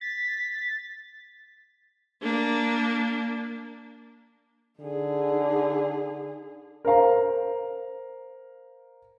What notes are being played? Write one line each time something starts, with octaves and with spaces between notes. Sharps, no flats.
A6 B6
A#3 D4
D3 D#4 G#4
A#4 C5 F5 A#5